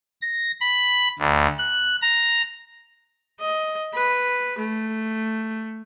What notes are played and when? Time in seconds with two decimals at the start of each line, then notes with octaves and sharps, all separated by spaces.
0.21 A#6
0.61 B5
1.19 D2
1.58 F#6
2.02 A#5
3.40 D#5
3.94 B4
4.59 A3